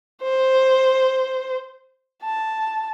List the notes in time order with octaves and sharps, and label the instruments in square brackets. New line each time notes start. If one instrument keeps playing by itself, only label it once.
[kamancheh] C5
A5